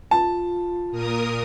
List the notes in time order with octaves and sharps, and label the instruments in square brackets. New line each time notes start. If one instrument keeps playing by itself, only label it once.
[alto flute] F4 [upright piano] A5
[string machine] A#2 A#4 D#6